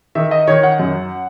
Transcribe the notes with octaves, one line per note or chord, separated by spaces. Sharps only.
D#3 E5
D#5
D#3 C#5
F#5
F#2